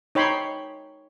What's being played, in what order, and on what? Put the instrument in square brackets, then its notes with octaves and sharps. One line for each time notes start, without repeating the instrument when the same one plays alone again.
[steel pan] D#4 C#5 G5 B5 C6